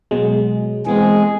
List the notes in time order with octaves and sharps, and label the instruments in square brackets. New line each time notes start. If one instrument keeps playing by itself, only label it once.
[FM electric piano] B2 F#3 G#3
[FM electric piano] E3 B3 C4 [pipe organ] G#3 G#4